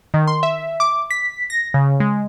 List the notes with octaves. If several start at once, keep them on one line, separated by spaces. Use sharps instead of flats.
D#3
C6
E5
D6
B6
A#6
C#3
G#3